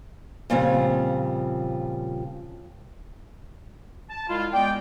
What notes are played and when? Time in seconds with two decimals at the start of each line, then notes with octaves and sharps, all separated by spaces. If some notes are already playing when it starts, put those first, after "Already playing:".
0.50 A#2 C#3 F3 G3 C4
4.10 A5
4.29 C2 G#3 E4 F4
4.53 G#3 B3 D5 G5